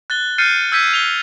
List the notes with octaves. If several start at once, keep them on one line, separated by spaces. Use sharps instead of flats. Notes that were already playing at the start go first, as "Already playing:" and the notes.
F#6 A6 G7
F6 G6 A6 C7 C#7 D#7
E6 G6 G#6 B6 D#7
F7 G7